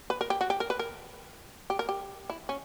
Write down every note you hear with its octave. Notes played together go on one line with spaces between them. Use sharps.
B4
A#4
G4
F#4
G4
A#4
B4
A#4
G4
A#4
G4
E4
C#4